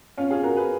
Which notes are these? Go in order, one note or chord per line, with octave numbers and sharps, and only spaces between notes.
C#4 F4
F4 G#4
F#4 A#4
G#4 B4